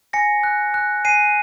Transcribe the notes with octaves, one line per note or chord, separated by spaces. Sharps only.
G#5 A#6 C#7
F#6
F#6
G#5 C7 D#7